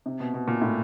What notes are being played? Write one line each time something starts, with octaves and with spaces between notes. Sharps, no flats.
C3
B2
B2
A#2
A2